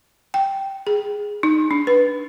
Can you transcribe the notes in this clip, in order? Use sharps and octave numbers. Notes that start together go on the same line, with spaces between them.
G5
G#4
D#4
D4
B4